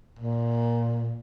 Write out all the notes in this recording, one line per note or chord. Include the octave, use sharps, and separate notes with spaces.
A#2